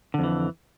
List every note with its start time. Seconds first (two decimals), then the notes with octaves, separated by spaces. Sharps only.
0.14 D3
0.19 F2
0.24 E3